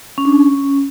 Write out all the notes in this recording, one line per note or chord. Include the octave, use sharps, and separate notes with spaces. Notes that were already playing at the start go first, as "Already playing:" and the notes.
C#4
D4
C#4